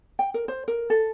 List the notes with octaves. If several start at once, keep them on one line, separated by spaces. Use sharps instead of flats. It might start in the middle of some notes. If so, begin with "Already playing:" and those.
G5
A#4
C5
A#4
A4